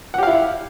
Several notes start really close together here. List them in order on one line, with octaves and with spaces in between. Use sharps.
F#5 G4 F5 E4